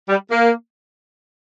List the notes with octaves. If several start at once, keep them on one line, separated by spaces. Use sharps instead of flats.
G3
A#3